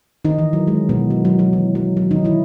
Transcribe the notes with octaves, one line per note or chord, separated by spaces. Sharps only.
D#3 D#4
E3
F#3
G#3
B2 B3
F#3
F#3
F#3
E3
F#3
F#3
D#3 D#4
E3 E4